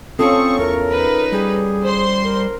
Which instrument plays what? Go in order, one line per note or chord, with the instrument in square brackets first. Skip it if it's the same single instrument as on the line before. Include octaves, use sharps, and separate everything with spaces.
[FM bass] C4 [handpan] C#4 F4 A4 [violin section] C#6 [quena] D#6
[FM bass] E2 [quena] A#4
[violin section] D#4 B4
[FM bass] G3 [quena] G#4
[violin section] C5 C6
[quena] A#4